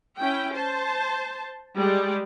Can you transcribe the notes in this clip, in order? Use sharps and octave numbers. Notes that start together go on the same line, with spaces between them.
C#4 E4 G5
C5 A5
G3 G#3 D5